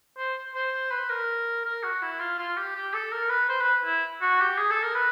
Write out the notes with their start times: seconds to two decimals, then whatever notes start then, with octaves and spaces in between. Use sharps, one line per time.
0.18 C5
0.55 C5
0.91 B4
1.10 A#4
1.65 A#4
1.83 F#4
2.02 E4
2.19 F4
2.38 F4
2.57 G4
2.76 G4
2.94 A4
3.12 A#4
3.29 B4
3.49 C5
3.61 B4
3.85 E4
4.22 F#4
4.41 G4
4.58 G#4
4.71 A4
4.83 A#4
4.95 B4